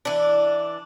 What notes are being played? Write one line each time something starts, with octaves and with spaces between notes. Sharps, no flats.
E3 D4